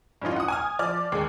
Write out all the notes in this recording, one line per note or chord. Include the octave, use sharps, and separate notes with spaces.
G2 E3 C#4 D#4 F4
F#5 D#6
G#5 D#6 F6
F3 D5 F6
D#2 G#3 D6